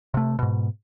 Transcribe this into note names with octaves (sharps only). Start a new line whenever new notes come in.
C3 A3
G#2 B2